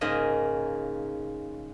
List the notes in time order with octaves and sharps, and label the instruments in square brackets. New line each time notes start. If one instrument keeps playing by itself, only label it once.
[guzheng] G#2 C#3 A#3 D#5